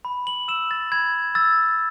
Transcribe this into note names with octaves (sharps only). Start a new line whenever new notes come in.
B5
F#7
E6 E7
A6
B5 G#6
E6 A6